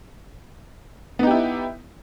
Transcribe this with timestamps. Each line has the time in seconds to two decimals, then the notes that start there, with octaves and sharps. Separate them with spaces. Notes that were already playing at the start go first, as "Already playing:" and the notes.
1.19 B3
1.23 D#4
1.27 G4
1.31 E4